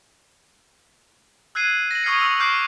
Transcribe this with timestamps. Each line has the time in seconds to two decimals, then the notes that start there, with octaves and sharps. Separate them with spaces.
1.55 E6 F#6 G#6 C7 D#7
1.91 A#6 F#7
2.04 C#6 D#6 F6 G#6 C7 C#7
2.20 C#6 E6 F#7
2.40 C#6 D6 F6 G6 C7 D7